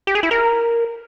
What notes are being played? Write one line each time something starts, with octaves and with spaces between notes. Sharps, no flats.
G4
G#4
E4
A#4